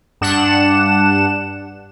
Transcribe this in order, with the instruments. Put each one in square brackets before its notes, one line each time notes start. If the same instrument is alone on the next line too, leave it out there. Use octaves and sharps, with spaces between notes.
[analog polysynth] G2 D4 F#5 E7